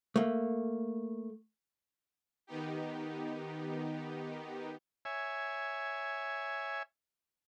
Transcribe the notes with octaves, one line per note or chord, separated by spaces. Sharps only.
A3 A#3
D#3 B3 D#4 G4
C#5 E5 G#5